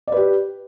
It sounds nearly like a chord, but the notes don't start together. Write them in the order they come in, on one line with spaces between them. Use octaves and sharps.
D5 B4 G4